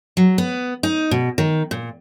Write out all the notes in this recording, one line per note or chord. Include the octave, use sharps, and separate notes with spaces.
F#3
B3
D#4
B2
D#3
A#2